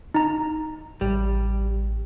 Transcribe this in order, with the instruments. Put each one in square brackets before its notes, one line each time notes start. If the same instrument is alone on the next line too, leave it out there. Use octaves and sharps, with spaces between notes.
[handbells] D#4 A#5
[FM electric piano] A1 [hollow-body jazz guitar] G3